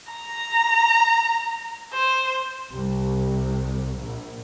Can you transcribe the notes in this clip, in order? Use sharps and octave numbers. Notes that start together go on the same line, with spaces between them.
A#5
C5
C2
A#1